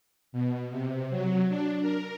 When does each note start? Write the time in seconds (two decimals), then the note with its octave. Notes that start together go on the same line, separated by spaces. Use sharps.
0.32 B2
0.70 C3
1.10 F#3
1.49 D4
1.81 A#4